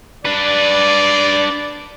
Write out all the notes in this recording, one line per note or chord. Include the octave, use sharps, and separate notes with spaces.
D4 B4 D5